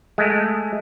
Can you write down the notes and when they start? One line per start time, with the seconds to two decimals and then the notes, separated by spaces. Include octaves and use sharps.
0.18 G#3 A3